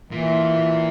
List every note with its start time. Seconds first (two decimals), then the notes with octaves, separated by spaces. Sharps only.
0.11 A#2 E3